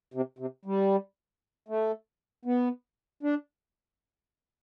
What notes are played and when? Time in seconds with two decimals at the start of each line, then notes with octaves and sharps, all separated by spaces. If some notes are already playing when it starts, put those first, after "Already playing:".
0.14 C3
0.39 C3
0.65 G3
1.68 A3
2.45 B3
3.23 D4